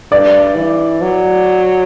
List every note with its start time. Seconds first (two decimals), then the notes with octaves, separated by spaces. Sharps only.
0.12 G2 D5
0.56 E3
1.02 F#3